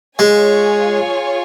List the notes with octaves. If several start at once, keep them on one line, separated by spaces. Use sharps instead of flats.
G#3 F4 G#4 C#5 G#5